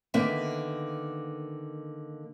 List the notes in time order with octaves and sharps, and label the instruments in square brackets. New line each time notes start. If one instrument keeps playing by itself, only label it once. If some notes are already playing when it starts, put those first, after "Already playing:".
[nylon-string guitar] D3 D#3 A#3 B3 E5